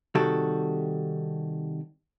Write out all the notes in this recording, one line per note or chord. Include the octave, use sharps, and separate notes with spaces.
C3 D#3 G3 F#4 G4 A4